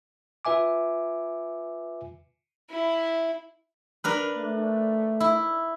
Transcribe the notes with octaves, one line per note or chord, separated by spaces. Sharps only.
F4 B4 E5 G#5 D6
E4
D4 A#4 B4
A3
E4